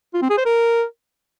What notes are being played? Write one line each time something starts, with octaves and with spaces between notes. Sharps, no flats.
F4
C4
G#4
C5
A#4